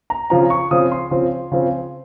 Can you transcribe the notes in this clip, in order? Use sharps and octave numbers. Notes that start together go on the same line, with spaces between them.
A#5
C#3 F3 C4 A#5
C#6
C#3 F3 C4 D#6
C6
C#3 F3 C4
C#3 F3 C4